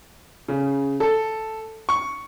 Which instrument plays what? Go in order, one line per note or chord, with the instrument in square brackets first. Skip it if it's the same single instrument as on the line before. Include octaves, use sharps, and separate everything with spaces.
[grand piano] C#3
A4
C#6